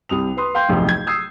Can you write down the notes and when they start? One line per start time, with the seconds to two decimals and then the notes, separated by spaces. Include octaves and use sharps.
0.09 C2 C3 D#6 F7
0.37 B4 B5 C6 D#6
0.55 F5 G5 C6 G6
0.69 D1 B1 F2 A2 C3
0.89 G#6
1.07 D#6 E6 G#6 C7